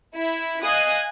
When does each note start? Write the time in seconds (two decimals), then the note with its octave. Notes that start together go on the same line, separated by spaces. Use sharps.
0.16 E4
0.62 D#5 F5 G#5 D#6 F#6